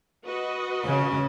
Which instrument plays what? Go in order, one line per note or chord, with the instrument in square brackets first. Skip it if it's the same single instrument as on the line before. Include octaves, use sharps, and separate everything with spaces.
[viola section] F#4 B4 D#5
[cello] C#3 C#4